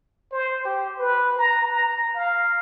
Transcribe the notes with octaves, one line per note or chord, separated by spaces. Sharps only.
C5
G4
B4
A#5
A#5
F5